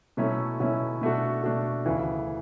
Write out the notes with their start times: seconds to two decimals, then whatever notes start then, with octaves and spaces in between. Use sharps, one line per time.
0.17 B2 F#3 A3 C#4 E4
0.60 B2 F#3 A3 C#4 E4
1.01 B2 A3 D4 F#4
1.44 B2 A3 D4 F#4
1.86 D2 C#3 E3